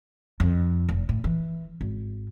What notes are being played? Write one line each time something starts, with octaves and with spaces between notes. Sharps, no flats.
F2
F1
A2
E3
G#1